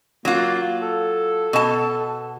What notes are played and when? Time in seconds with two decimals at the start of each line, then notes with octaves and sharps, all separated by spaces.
0.25 F#3 A#3 F4
0.82 A4
1.53 B2 A5